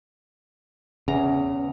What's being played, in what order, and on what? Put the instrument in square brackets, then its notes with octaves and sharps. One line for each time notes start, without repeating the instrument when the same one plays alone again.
[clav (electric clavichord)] E2 A#5 [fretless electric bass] C#3